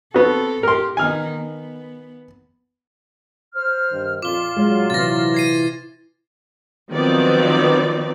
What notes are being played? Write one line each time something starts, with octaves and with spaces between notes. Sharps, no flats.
B3 C4 F#4 A4
A2 G4 A#4 C6
D#3 B3 D#4 G#5 F6
B3
C5 F6
G2 D#3
F2 A#2 F4 D6 G7
F#3 G#3
C3 E3 A6 A#6
G#6 C7 D#7
D#3 F3 F#3 B3 C4 D5